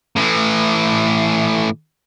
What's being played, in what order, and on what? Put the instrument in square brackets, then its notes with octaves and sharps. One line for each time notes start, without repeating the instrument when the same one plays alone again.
[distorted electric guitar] A2 E3